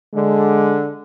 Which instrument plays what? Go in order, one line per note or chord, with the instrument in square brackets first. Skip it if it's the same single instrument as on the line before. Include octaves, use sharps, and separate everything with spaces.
[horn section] D3 [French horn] G#3